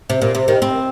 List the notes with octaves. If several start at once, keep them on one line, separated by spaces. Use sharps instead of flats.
C3
A#2
C3
D#3
C4